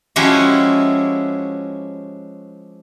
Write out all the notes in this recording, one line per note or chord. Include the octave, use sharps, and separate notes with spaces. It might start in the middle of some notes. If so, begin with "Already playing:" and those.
F3 G#3 C#4 E4 F#4 G4